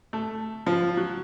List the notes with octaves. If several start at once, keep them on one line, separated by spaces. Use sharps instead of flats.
A3
F3
F#3